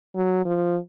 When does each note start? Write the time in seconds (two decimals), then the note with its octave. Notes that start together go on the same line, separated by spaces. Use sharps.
0.15 F#3
0.45 F3